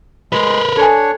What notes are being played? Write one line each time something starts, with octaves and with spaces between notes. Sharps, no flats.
G#3 A#4 B4
D4 A4 C#5 G#5